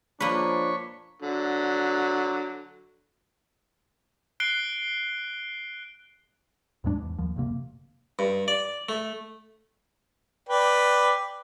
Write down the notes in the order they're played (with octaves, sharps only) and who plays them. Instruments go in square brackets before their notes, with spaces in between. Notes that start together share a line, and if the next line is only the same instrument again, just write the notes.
[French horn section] F3 [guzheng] A#3 B4 [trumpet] D4 [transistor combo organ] C#5 B5 C#6
[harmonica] D3 F#3
[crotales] F#6 C7 D7 G7
[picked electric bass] D#2 G#2 G#3 D4
E2
D#2 F3
F#1 D2 C3 A#3
[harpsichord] G2
D5
A3
[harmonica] B4 D5 G5